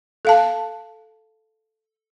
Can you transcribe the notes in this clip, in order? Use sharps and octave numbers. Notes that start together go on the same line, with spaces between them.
A4 F5 A5